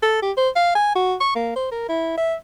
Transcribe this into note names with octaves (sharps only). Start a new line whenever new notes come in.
A4
G4
C5
F5
G#5
F#4
C#6
A#3
C5
A#4
E4
E5